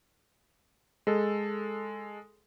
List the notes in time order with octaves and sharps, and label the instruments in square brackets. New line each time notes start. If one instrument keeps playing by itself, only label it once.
[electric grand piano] G#3 A4